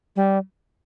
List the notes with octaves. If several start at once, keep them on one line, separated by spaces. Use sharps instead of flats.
G3